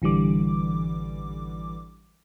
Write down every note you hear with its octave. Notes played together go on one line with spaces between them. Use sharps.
A1 D3 E3 G3 D6